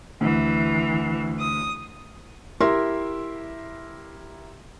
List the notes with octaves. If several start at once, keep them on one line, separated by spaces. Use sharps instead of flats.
D2 E3
D#6
E4 G4 A#4 E5 C6